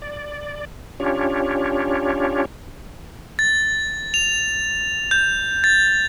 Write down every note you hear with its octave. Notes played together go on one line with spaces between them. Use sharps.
D5
C#4 D4 F4 G4 C#5
A6
F7
G6
A6